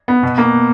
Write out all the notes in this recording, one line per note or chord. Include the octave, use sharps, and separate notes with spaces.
B3
B2
A#3